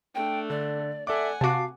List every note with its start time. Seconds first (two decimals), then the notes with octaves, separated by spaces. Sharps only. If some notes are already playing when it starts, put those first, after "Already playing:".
0.15 A3 D4 G5
0.50 D3 D5
1.07 A4 D5 E5 F#5 G#5 D6
1.41 C3 F#4 F5 A5 D6